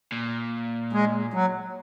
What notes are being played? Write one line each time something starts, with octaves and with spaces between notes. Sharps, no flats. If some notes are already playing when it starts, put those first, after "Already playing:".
A#2
G#3
F#3